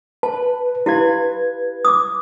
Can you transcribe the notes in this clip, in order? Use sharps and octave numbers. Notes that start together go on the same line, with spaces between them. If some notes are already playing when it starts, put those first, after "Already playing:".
B4 A5
E4 G4 B4 F5 G#6
D6 D#6